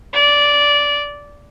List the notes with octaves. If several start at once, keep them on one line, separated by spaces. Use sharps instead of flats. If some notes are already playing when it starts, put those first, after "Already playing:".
D5